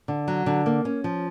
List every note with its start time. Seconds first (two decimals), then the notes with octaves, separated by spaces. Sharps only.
0.08 D3
0.28 F#3
0.46 D3
0.66 A#3
0.85 C#4
1.04 F3